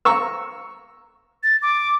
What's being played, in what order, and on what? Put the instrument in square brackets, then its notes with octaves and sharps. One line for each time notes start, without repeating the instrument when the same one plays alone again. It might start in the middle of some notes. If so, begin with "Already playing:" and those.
[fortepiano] A#5 C#6 E6
[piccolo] A6
D6